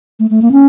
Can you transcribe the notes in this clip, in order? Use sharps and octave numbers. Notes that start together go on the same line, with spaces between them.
A3
A3
A#3
C#4